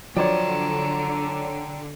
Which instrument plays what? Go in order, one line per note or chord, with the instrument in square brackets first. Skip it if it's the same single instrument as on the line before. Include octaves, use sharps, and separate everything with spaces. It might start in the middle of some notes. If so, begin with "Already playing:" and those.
[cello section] D3 [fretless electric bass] F3 F#3 [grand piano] C#5 D5 [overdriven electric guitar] G5 A#5